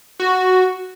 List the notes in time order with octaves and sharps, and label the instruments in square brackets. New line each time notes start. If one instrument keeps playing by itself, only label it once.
[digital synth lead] F#4